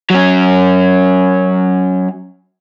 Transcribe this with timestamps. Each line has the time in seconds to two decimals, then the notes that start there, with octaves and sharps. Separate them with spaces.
0.10 F#3 C#4